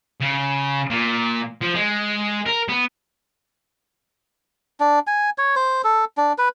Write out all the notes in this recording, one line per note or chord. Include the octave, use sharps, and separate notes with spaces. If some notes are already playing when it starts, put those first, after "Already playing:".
C#3
A#2
F3
G#3
A#4
B3
D4
G#5
C#5
C5
A4
D4
B4